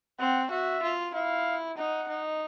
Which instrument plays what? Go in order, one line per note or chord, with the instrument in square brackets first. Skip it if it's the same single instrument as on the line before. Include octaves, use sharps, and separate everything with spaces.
[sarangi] C4 [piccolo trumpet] F#5
[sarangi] F#4 [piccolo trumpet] E5
[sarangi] F4
[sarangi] E4 [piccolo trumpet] F5
[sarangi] D#4 [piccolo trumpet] F#5
[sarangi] D#4